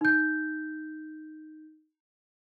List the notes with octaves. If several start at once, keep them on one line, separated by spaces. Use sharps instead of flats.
D#4 G6